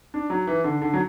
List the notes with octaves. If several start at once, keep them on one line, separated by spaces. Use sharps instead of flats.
D4
F#3
E3
D3
D3
F#3